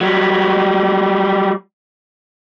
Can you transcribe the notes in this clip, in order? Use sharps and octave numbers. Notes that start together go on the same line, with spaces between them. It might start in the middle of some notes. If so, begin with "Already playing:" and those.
F#3 G3